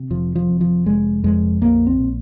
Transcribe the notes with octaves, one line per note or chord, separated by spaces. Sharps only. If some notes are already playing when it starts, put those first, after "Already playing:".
Already playing: C3
F1 F3
F3
F2
F3
F1 G#3
F2 G#3
A#1 A#3
C4
A#2